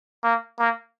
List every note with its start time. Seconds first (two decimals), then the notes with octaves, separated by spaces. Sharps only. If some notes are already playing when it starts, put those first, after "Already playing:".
0.24 A#3
0.59 A#3